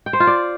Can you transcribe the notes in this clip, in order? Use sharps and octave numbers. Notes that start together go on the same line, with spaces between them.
G5
C5
F4
D5